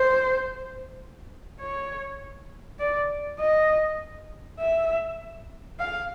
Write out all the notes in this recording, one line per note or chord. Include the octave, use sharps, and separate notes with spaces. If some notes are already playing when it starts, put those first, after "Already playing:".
Already playing: C5
C#5
D5
D#5
E5
F5